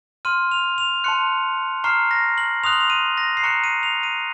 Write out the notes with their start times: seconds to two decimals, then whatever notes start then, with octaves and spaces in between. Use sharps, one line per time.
0.25 C6 F6 D#7
0.51 F7
0.78 F7
1.04 A5 C6 F#6 C#7
1.84 A#5 C#6 F6 C7
2.11 A#6
2.38 F#7
2.64 C6 D#6 F#6 F7
2.73 F#7
2.81 F7
2.90 D#7
3.17 A#6
3.37 C7
3.43 A#5 C#6 F#6 C#7
3.64 D#7
3.83 F7
4.03 D#7